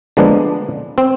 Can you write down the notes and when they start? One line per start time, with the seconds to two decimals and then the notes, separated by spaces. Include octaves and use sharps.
0.17 D3 F3 G#3 A#3 B3 D4
0.98 C4